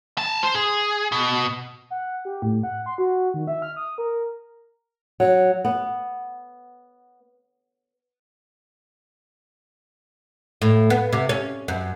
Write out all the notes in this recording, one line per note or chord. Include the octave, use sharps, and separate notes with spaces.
G#5 A5
C5
G#4
B2
F#5
G4
A2
F#5
C6
F#4
D#3
E5
F6
D#6
A#4
F#3
B3
A2
B3
C3
C#4
F#2